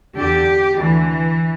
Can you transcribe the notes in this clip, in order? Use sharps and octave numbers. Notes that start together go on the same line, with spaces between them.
E2 D3 G4
D2 D3 E3